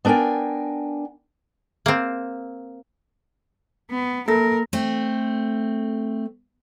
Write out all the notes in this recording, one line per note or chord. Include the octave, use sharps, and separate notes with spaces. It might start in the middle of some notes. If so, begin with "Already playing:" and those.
B3 D4 A#4 G5 G#5
A#3 C4
B3
A#3 A4 A#4 A#6
A3 C4